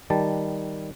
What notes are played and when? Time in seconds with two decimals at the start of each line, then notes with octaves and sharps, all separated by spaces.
0.10 D#3 G3 A5